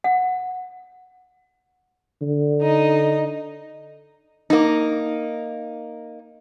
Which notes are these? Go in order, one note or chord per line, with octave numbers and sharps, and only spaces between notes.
F#5
D3
D#4 D#5
A#3 D#4